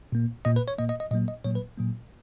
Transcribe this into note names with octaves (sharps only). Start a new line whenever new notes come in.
A#2 A#3
A#2 A#3 D#5
B4
C#5
A#2 A#3 D#5
D#5
D#5
A#2 F#3 A#3 D#5
D#5
A#2 F#3 A#3 C#5
B4
A#2 F#3 A#3